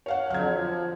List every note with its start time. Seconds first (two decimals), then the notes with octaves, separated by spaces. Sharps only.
0.06 C#5 F5 F#5
0.30 F2 D3 F#3 F6 G#6
0.53 F3